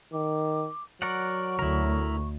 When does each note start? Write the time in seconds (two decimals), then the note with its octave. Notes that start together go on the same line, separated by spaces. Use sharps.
0.13 D#3 D6
1.02 F#3 A#4 D5 F#5 C#6
1.59 D2 E4 A#4